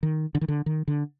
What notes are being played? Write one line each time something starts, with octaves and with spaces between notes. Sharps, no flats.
D#3
D3
D#3
D3
D#3
D3